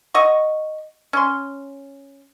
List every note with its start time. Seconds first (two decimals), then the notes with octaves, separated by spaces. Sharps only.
0.14 D#5 F#5 C#6
1.13 C#4 C6